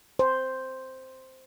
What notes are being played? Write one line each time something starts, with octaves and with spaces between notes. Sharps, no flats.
C5